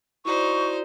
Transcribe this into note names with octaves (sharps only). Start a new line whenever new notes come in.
D#4 E4 F#4 C5 D5 C#6